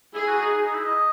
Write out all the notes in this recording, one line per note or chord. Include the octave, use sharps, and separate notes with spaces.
E4 G#4
F#4
D#4
D#4
E4
D#5